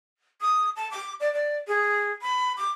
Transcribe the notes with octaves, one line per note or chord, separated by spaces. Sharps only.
D#6
A5
D6
D5
D5
G#4
B5
D6